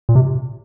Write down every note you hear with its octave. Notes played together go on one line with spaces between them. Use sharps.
A#2
C3